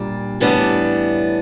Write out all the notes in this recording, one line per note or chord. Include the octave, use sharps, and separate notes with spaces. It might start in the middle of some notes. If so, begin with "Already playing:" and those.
Already playing: A#2 G3 D4
A2 E3 G3 B3 D4